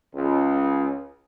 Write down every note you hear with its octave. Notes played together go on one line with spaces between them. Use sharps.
C#2